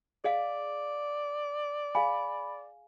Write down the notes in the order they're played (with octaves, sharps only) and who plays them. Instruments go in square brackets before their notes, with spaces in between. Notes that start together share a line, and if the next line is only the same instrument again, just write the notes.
[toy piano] G#4 D#5 F5 [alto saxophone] D5
[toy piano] G#4 F5 G#5 [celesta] B5